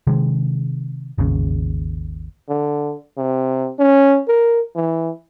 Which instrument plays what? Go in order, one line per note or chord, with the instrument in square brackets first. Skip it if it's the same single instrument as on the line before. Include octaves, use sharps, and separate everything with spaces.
[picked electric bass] C3 D#3 G#3
G#1 D#2 C#3
[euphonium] D3
C3
C#4
A#4
E3